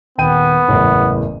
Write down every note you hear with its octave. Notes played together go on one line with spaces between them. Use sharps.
D#1 B3 G5 D#7
F#1 E2 A2